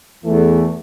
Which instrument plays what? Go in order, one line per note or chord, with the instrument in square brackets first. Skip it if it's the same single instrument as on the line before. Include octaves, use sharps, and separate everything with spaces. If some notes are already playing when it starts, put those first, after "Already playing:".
[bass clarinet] E2 [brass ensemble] E3 A3